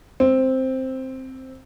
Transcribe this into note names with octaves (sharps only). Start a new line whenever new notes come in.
C4